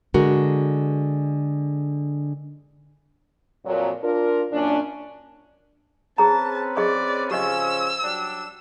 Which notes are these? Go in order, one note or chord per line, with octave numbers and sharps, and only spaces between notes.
D3 G#3 F#4 A#4
F2 A#2 F#3
D4 F4 A#4
F#2 A#2 C#4 D4
C4 C#4 G#4 B4 A5 A#5
G#4 D5 D#5 C#6
C#3 F3 C#4 G4 D#5 E6
F#3 G3 D4